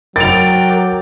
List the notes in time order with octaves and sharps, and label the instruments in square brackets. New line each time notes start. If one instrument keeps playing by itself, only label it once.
[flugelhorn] F#3 [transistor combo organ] A#4 G5 D6 [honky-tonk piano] A6 D7 F7